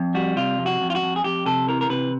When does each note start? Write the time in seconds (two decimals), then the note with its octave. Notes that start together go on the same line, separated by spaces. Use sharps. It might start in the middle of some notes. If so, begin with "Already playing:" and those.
Already playing: F2
0.14 G3 F#4
0.36 C3 F4
0.59 F2
0.66 F#4
0.81 F2
0.90 F4
0.95 F#4
1.02 F2
1.16 G#4
1.24 F2 G4
1.46 C3 A4
1.67 E3 A#4
1.81 A#4
1.89 C3 B4